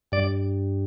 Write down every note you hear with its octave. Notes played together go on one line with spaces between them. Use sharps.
G2 D5